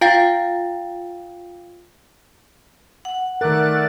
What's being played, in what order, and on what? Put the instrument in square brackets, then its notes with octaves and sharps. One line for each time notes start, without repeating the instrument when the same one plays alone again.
[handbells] F4 F5 G5 A6
[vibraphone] F#5
[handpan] D#3 A#4 [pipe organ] A3 D5 A6 [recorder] F#6